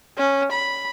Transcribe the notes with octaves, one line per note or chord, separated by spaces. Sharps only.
C#4
B5